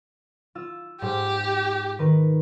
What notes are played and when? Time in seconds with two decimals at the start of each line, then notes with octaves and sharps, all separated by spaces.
0.55 F4 E6
1.02 G#2 G4
1.99 D#3 A#4 B4